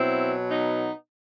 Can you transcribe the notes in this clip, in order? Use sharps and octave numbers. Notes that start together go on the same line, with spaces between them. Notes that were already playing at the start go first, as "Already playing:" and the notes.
Already playing: B2 F#3 C4 E4
B3 D#4